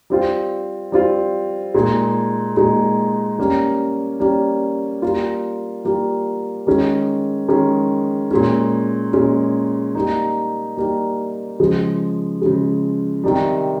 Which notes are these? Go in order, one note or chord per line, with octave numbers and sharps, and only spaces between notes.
G3 C4 F4
G3 C4 F4
A#2 G#3 D#4
A#2 G#3 D#4
G3 A#3 C#4
G3 A#3 C#4
G3 A#3 F4
G3 A#3 F4
D#3 G#3 C#4
D#3 G#3 C#4
A#2 G#3 C#4
A#2 G#3 C#4
G3 A#3 D#4
G3 A#3 D#4
C#3 F3 G#3
C#3 F3 G#3
C3 D#3 G3